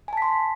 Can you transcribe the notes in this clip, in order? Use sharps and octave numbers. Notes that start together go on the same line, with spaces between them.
G#5 A5 C6 B6